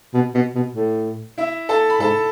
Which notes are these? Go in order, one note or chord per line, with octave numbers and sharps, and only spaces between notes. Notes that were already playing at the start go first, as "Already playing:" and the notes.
B2
B2
B2
A2
E4 E5
A4 A5
B5
G#2 A4 A5